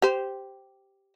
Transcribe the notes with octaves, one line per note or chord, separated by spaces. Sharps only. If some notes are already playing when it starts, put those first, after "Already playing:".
G4 C5